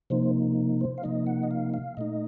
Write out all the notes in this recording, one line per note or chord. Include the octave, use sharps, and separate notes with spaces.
C3 F3 A#3 D#4 C5
C5
F5
C3 F3 A#3 D#4 D#5
F#5
D#5
F5
F5
A#2 A3 D#4 D#5